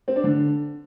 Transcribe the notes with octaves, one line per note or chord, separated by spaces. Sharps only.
C4
D4
D3